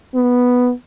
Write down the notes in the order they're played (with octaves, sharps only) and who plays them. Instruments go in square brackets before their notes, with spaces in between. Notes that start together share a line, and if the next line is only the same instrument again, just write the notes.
[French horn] B3